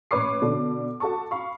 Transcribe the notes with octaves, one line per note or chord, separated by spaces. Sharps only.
A1 B4 C#5 C#6 D6 C7
B2 D3 D4 A4
F#4 A4 A5 C#6
F5 B5 C#6